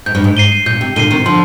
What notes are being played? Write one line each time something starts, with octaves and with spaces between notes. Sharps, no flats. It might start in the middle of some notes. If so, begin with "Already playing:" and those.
G#2 G6
G2
G#2
C7 D#7 G7
A#2 G6
C3
A#2 D3 C7 D#7 G7
C3 D#3
D3 F3 C6